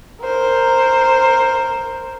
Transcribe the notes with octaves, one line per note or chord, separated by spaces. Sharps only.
A#4 C5